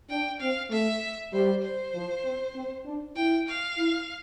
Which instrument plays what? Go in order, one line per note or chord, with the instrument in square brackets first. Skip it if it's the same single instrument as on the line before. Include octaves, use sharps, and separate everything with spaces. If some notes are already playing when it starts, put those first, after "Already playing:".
[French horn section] D4 [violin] G5
[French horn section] C4 [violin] F5
[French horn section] A3 [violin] E5
[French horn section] G3 [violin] C5
[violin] C5
[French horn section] F3
C4
C4
D4
[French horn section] E4 [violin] G5
[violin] F5
[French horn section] E4